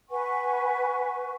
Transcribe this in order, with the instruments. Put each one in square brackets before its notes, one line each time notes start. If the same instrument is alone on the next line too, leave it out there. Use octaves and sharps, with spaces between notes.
[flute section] B4 F#5 G#5 C#6